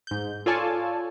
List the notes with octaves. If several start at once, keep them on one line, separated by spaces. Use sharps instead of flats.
G#2 G6
F4 A4 C#5 D5 G#5 A5